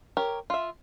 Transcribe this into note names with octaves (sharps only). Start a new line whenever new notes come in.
G4 A#4 C#5
F4 E5